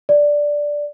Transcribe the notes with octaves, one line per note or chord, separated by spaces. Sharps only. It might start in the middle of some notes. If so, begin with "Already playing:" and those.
D5